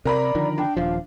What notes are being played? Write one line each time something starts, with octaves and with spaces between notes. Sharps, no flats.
C3 A#4 D5 A#5 B5
D3 D#3 F3
D4 G5
D#1 F3 F5